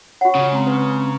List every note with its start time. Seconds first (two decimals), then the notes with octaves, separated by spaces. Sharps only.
0.21 F#4 C#5 F#5 C#6
0.35 C#3
0.51 G#3 C4 A#5
0.67 B4